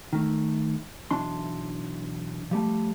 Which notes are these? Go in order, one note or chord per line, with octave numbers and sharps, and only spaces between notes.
D#3 A3
B1 E3 D4 C6
F3 G3 A3